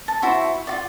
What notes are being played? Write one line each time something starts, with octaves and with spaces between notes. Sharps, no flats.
A5
E4 F#4 C5 E5
F4 F#4 D5